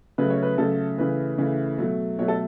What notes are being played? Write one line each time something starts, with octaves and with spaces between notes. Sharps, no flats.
C#3 F#3 A3 B4
C#5
B4
C#3 F#3 A3 A4
C#3 E3 A3 B4
C#3 E3 A3
B2 F#3 A3
B2 F#3 A3 C#5
A4